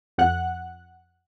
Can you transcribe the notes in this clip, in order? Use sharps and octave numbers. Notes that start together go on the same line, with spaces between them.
F2 F#5 F#6